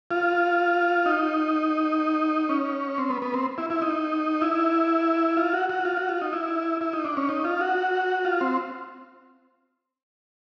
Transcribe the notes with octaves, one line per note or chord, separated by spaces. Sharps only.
F4
D#4
C#4
C4
B3
B3
C4
E4
E4
D#4
E4
F4
F#4
F#4
F4
F#4
F4
D#4
E4
E4
D#4
D4
C#4
D#4
F4
F#4
F4
C4